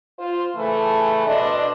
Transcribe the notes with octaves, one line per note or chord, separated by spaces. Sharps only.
F4 C5
C#3 E3 A3
B2 D4 C5 D#5